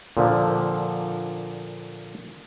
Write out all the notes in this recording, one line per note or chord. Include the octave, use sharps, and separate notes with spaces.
A#2 D3 F3